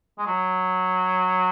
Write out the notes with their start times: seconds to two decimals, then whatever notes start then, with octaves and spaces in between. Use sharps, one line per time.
0.18 G#3
0.26 F#3